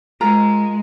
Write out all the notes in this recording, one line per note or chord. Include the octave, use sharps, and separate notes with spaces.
G#3 F4 A#4 A#5